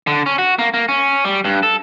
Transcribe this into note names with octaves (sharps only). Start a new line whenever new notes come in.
D3
C#4
F#4
A#3
A#3
C#4
G3
G2
A4